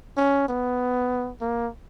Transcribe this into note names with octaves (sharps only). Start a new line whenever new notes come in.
C#4
B3
A#3